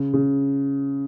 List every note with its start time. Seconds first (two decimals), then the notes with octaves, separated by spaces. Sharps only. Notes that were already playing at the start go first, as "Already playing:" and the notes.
Already playing: C#3
0.13 C#3